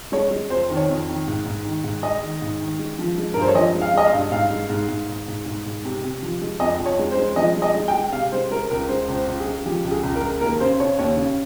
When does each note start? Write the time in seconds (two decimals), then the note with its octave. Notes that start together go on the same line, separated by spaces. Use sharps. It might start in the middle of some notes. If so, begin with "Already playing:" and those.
0.12 G#3 C#5
0.31 G#3
0.50 F2 C5
0.70 D#3
0.77 C#5
0.89 F2
1.08 D#3
1.27 G#2
1.46 G#2
1.65 D#3
1.84 G#2
2.02 G#3 D#5
2.23 D#3
2.42 G#2
2.61 D#3
2.79 G#3
2.99 F3
3.18 G#3
3.34 G2 A#4
3.42 C5
3.48 C#5
3.55 F3 D#5
3.75 G#3
3.82 F5
3.94 G#3 D#5
4.06 F5
4.13 G2
4.32 G#2 F5
4.50 G#3
4.69 G#2
4.88 G#2
5.08 G#2
5.28 G#2
5.46 G#2
5.66 G#2
5.85 C3
6.04 C3
6.22 F3
6.42 G#3
6.60 F2 D#5
6.79 F2
6.86 C#5
6.99 G#3
7.11 C5
7.17 G#3
7.36 F3 D#5
7.56 G#3
7.62 D#5
7.75 G#3
7.88 G5
7.94 G#3
8.12 C3 F5
8.32 G#3 C5
8.51 G#3 A#4
8.70 C#2 A#4
8.88 G#3 C5
9.08 C#2
9.14 C5
9.27 C#2
9.40 G#4
9.46 G#3
9.65 F3 G4
9.84 C#2
9.91 G#4
10.03 C#2
10.16 A#4
10.23 G#3
10.41 D#2 A#4
10.60 C#3 C5
10.80 C#3 C#5
10.99 D#2 C#5
11.17 C#3